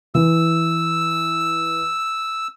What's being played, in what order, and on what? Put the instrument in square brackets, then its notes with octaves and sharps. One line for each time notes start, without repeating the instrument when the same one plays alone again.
[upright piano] E3 [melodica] E6